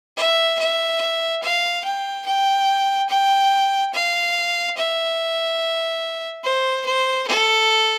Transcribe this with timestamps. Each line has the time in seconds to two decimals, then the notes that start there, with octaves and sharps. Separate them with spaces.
0.17 E5
0.59 E5
1.42 F5
1.84 G5
2.26 G5
3.09 G5
3.93 F5
4.77 E5
6.44 C5
6.86 C5
7.27 A4